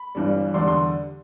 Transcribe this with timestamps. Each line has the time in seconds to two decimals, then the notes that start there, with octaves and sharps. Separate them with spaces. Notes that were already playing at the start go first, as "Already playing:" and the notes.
Already playing: B5
0.15 G1 G2 E3 G3
0.54 E2 D3 G3 D4 C6
0.68 C6